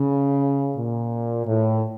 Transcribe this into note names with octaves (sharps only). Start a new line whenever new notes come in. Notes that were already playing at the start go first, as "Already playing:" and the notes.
Already playing: C#3
A#2
A2